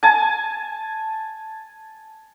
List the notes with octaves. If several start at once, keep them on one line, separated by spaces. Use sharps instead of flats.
G#5 A5